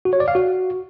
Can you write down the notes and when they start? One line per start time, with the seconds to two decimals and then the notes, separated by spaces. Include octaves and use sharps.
0.05 F#4
0.13 C#5
0.20 D5
0.28 F5
0.35 F#4